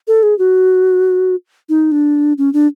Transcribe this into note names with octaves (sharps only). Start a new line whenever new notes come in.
A4
G#4
F#4
D#4
D4
C#4
D4